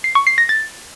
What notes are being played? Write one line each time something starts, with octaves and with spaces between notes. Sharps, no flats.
C7
C#6
C7
A#6
A6